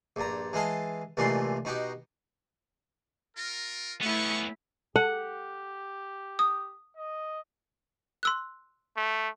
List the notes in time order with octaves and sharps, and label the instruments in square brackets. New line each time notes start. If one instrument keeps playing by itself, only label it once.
[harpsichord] A#1 G2 A#5
E3 G#3 D#5 F5 A5
C2 A#2 E3 G#3 A3 C6
B2 D#4 F#4 G4
[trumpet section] F4 A#4
[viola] A3 E4 [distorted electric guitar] B3 C#4 [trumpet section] F5 C#6
[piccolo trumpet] G4 [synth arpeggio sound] A4 [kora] F#5
[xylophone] D#6
[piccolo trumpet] D#5
[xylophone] C6 E6 F#6
[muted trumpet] A3